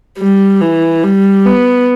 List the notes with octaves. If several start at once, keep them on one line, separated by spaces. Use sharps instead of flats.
G3
E3
G3
B3